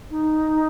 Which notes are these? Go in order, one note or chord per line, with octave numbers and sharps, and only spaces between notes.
D#4